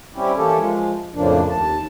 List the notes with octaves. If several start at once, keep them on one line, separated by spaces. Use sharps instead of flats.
G3 C4 C#4 E4 G4
E3 A#3 C#4 G4 A4
F3 G#3
F2 A2 C#3 F3 A#3 D4
D#2 A5